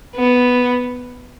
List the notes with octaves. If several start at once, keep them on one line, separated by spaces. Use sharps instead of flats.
B3